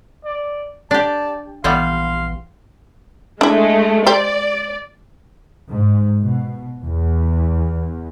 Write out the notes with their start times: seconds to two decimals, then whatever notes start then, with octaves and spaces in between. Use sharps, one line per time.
0.24 D5
0.91 D4 G4 D5 A5
1.64 A#1 E3 G3 B3 F5 C6
3.41 G#3 A3 D4 E4
4.06 G4 C5 D5
5.69 G#2
6.25 B2
6.83 E2